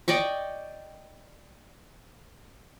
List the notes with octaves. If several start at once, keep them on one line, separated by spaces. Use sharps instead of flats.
D5 D#5 G5 C#6